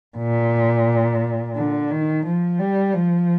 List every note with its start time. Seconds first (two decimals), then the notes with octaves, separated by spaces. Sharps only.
0.18 A#2
1.56 D3
1.90 D#3
2.25 F3
2.59 G3
2.94 F3